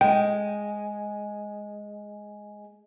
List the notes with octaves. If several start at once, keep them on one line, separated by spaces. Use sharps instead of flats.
G#3 G5